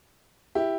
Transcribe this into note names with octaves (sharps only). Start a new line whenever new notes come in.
E4 G4